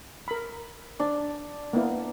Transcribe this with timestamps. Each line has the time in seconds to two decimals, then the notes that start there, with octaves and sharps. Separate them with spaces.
0.28 A#4 B5
1.00 D4
1.73 A#3 B3 E4